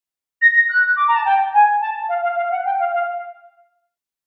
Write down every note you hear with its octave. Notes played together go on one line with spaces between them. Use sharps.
A#6
A#6
F#6
D6
A#5
A5
G5
G#5
A5
F5
F5
F5
F#5
G5
F5
F5